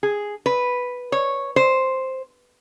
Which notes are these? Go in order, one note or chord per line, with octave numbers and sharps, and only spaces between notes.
G#4
B4
C#5
C5